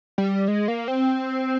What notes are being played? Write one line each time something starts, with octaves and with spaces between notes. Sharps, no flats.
G3
G#3
A#3
C4